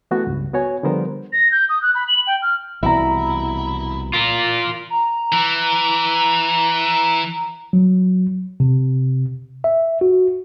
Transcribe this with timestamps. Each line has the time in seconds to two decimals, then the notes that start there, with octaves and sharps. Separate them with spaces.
0.11 E3 A3 B3 F#4
0.27 C#2 G2
0.53 B3 F#4 C#5 G#5
0.83 D3 F3 G3 B3 A#4 C5
1.33 A#6
1.52 G6
1.69 D#6
1.82 F#6
1.95 B5
2.08 F#7
2.27 G5
2.42 F6
2.83 C2 B2 E3 E4 A#5
4.13 F4 A#4
4.90 A#5
5.32 E3
7.73 F#3
8.60 C3
9.64 E5
10.01 F#4